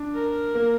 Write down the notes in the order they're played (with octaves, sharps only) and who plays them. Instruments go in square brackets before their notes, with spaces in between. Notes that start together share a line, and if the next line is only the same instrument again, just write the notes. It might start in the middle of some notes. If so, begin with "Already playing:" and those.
Already playing: [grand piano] D4
[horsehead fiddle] A#4
[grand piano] A#3